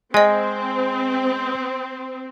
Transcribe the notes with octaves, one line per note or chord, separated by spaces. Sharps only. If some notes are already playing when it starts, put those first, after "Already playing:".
G#3 C4 D#5 G#5